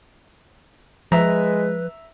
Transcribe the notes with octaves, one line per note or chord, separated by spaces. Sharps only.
F3 G#3 B4 E5 A#5